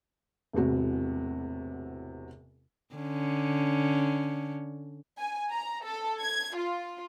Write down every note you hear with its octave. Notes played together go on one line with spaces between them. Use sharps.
E1 A1 E2 C3 F#4
D3 C#4
G#5
A#5
A4
G#6
F4